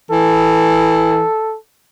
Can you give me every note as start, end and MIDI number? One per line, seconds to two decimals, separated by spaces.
0.11 1.23 52
0.11 1.56 69